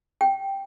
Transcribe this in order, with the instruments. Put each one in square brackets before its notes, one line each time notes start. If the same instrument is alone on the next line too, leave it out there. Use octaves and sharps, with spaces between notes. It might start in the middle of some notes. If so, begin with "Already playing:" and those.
[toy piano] G5